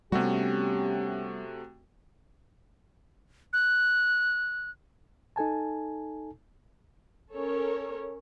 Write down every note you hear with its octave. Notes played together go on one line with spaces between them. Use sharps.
C3 G3 A3 B3 C#4 F#4 G4
F#6
D#4 A4 G#5 A5
C#4 A4 A#4 C#5